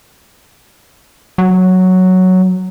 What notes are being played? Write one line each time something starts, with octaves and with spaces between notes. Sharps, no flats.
F#3